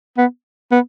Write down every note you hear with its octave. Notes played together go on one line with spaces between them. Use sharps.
B3
B3